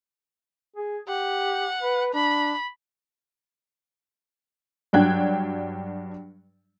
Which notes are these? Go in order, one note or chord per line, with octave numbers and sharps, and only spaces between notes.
G#4
G4 F#5
B4
D4 B5
G2 F#3 D4 G5 F#6 G#6